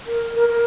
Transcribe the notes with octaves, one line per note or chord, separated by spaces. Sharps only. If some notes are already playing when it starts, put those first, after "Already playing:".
A#4
A#4
A#4